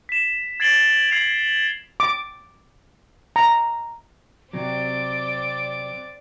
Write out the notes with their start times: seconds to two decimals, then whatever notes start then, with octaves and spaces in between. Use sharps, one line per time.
0.09 B6 E7
0.60 G#6 A6 C7 D7 F#7 G7
1.10 G#6 C7 F7 F#7
2.00 D6
3.36 A#5
4.53 C3 F#3 C4 D5 D6